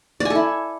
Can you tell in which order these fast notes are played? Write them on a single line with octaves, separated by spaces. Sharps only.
D5 G#5 A4 E4